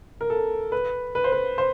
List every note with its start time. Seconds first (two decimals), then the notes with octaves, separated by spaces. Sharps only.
0.21 A#4
0.30 A4
0.72 B4
1.15 B4
1.24 C5
1.32 B4
1.58 C5